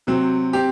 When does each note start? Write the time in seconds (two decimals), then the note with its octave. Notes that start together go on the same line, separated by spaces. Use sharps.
0.07 C3 F#3 C4
0.53 C4 G4